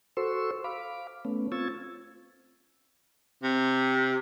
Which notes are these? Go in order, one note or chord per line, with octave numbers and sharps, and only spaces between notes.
F#4 A4 C5 C6 C#6 E6
F5 B5 D6
A3 B3 C#4
C4 F4 C#6 E6 G#6 A6
C3